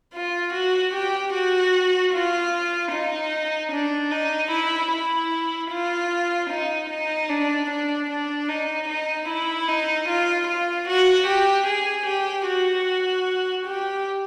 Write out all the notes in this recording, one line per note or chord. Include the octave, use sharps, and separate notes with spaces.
F4
F#4
G4
F#4
F4
D#4
D4
D#4
E4
E4
F4
D#4
D#4
D4
D4
D4
D#4
D#4
E4
D#4
F4
F4
F#4
G4
G#4
G4
F#4
G4